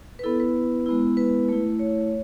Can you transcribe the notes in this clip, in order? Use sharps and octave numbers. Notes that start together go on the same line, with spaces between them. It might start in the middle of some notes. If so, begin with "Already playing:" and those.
B4
B3 E4 A4
B4
G#3 B3 E4
B4
A3 E4
C#5